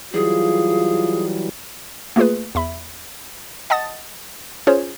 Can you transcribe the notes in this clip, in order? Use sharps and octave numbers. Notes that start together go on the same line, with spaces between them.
E3 F#3 G3 F4 G#4
A3 A#3 F4 G#4 B4
E2 E5 B5
D#5 F#5 A5 D#6 A6
C#4 F4 G#4 C5 C#5